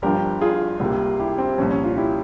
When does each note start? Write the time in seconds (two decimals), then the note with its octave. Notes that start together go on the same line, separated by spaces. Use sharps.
0.02 G1 G2 F3 G4 A#4
0.41 F4 G#4
0.80 C#2 C3 G3 A#3
1.19 E4 G4
1.38 C4
1.58 C2 A#2 F3 C#4
1.71 C#4
1.84 C#4 F4
1.97 E4 G4